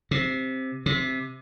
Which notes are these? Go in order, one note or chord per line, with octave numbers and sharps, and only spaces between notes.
C3
C3